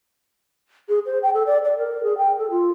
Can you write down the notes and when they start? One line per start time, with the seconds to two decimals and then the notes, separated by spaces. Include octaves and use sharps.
0.89 G#4
1.06 C5
1.23 G5
1.34 A4
1.46 D5
1.65 D5
1.78 A#4
2.03 G#4
2.18 G5
2.39 A4
2.51 F4